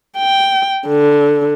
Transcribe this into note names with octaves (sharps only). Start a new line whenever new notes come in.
G5
D3